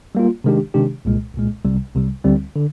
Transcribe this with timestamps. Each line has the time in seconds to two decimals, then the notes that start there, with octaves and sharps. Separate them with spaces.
0.15 G3 A#3 F4
0.44 C3 D#3 G#3 D4 G4
0.74 C3 D#3 G#3 D4 G4
1.05 C2 A#2 G#3
1.35 C2 A#2 G#3
1.65 C2 C3 G3
1.95 C2 C3 G3
2.24 D2 D3 G3 C4
2.55 D3